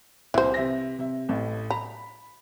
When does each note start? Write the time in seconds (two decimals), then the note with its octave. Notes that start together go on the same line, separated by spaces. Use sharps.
0.34 C2 E3 C5
0.54 C3 E5 A#6
0.99 C3 E5
1.29 A1 A2
1.71 A#5 B5